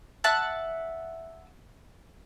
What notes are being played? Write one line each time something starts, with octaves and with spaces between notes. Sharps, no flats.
E5 F#5 A5 F#6